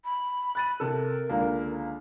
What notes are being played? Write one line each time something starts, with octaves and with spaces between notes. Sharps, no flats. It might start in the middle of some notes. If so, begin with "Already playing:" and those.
B5
B5 F#6 A6 D#7
C3 A4 A#4
C#2 D3 A#3